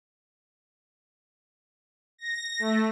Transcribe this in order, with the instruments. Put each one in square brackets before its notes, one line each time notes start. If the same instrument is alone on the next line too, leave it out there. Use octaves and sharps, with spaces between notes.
[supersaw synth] A#6
A3